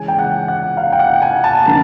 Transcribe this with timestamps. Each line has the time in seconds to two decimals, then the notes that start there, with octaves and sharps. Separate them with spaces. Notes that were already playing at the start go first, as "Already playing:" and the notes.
Already playing: C#3 E3 G#3 C#4 G#5
0.08 G5
0.19 F#5
0.48 F#5
0.77 F5
0.92 G5
0.99 F#5
1.13 G5
1.22 G#5
1.44 A5
1.59 A5
1.66 D3 F3 A#3 A#5